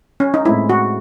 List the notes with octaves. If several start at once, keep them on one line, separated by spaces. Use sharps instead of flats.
C#4
D#4
A2 G#3 C4 E4
F#4